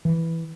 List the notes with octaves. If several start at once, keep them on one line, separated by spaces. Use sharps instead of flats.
E3